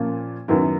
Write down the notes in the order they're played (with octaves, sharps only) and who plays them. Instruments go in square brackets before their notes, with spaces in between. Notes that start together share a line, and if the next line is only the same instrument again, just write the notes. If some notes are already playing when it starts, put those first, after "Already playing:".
Already playing: [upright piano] A#2 F3 A#3 C#4
F#2 D#3 F#3 B3 E4